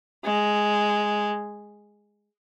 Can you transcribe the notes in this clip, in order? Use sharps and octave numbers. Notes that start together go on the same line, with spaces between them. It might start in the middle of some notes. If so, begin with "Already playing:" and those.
G#3